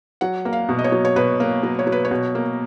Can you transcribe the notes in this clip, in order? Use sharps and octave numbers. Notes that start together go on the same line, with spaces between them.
F#3 F#5
A#3
F5
B2
D#5
C#5
F#3
C#5
B2 B4
A#3
F#3
C#5
F#3
B4
C#5
B2
A#3